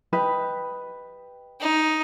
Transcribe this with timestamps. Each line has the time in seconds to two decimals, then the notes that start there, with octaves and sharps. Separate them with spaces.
0.13 G4 B4 D#5
1.61 D#4